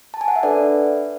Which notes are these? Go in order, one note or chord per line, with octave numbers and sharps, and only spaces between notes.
A5
G#5
F#5
E5
D4 A4 B4 D5